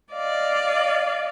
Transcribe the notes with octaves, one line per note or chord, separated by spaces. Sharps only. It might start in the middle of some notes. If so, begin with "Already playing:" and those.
D5 D#5 F5